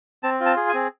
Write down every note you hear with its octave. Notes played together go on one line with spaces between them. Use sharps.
C4 A5
F4
A5
G#4
G#5
C4